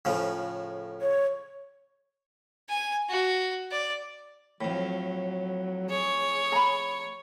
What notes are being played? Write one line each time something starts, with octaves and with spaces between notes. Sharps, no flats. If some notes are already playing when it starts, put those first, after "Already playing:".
A2 C#3 F3
C#5
G#5
F#4
D5
F2 A2 F#3
G#4 C#5
A#5 B5